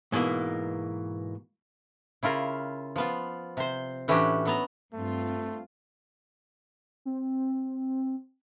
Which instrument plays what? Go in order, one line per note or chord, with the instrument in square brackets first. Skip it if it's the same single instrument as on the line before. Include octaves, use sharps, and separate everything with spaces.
[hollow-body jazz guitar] G#2 B2 E3 A#3
[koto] C#3 E4 F4 A#4
F3 B3 F4
C3 C5
A2 E3 C#4 D4 F#4 G4
F#3 B3 A#5
[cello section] G2 C4 F4 [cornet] A3
[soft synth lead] C4